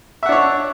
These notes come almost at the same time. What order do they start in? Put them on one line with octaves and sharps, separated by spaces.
E5 F#5 D4 C#5